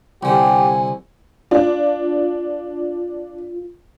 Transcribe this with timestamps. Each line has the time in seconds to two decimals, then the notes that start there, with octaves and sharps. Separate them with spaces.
0.23 C2 D3 G4 G#5
1.51 D4 F4